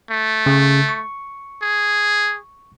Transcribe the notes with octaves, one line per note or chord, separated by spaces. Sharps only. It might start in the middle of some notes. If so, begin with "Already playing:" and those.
A3
C#3
C#6
G#4